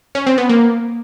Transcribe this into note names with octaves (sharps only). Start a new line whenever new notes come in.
C#4
C4
B3
A#3